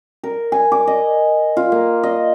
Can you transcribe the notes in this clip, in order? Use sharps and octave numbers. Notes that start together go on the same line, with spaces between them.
A#4
G#5
D6
D#5
F4
A#3
D#5